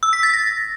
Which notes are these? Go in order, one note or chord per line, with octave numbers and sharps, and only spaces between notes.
E6
B6
A6
A#6